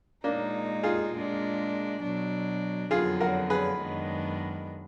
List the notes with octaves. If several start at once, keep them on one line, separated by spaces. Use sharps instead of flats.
A#2 G#3 A#3 D4 D#4
F4 G#4
A#2 G#3 D4
B2 F#3 D4
F2 D3 F#3 B3 F4 G#4
F#4 A#4
G#4 B4
F#2 D#3 G#3 B3 D4